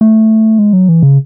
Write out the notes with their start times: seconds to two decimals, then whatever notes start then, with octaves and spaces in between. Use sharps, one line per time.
0.01 A3
0.59 G#3
0.73 F#3
0.89 E3
1.03 C#3